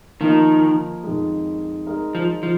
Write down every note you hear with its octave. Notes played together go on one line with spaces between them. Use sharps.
D#3 F3 A#3 F4 A#4 D#5
F2 D#3 G#3
G#3 D#4 A#4
F3
F3